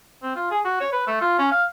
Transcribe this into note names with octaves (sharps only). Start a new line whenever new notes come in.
C4
F4
G#4
F#4
C#5
B4
A3
F4
C#4
F5